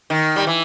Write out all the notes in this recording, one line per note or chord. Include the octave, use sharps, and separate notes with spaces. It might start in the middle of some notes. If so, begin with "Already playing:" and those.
D#3
G3
E3